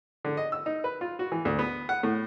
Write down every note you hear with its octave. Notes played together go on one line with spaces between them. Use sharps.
D3
D#5
E6
D#4
B4
F4
F#4
E3
D2
B3
F#5
A2